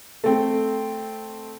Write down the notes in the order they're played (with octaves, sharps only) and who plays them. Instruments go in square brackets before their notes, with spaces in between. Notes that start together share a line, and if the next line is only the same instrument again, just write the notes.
[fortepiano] A3 C4